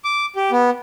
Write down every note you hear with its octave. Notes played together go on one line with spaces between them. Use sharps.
D6
G4
B3